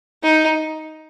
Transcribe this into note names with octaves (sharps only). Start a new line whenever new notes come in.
D#4